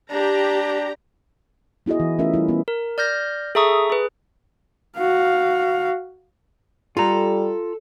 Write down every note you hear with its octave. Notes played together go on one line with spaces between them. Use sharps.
D4 G4 A#5
B3 E4 F#4 G#4 D#5
E3
A3 C#4 F4 A#4 E5
G3 E4
B3
A#4
D5 F6 G6 A#6
G#4 A4 E5 A#5 C#6 D#6
G#4 B4
F#4 F5
G3 F4 A4 A#5